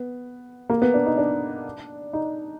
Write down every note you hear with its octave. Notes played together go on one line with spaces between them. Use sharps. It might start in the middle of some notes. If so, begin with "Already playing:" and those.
Already playing: B3
A#3
B3
D4
D#4
D4
D#4